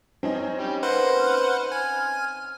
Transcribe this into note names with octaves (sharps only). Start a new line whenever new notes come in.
C4 C#4 D#4
G3 G4
A#3 B4 C5 F#5
F6
G#5